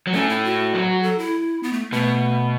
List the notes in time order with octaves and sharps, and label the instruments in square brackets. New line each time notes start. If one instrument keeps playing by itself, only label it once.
[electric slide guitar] F#3
[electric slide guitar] A2 A3 [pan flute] C#4
[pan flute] E4
F#4
[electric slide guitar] F#3
[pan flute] A4
E4
B3
A3
[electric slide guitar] B2 B3 [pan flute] A3